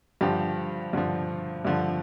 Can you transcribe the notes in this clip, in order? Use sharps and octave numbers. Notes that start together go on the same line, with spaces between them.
G2 D3 F3 G4
G2 D3 F3
G2 D3 F3